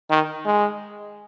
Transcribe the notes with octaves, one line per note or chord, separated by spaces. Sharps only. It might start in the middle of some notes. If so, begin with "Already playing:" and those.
D#3
G#3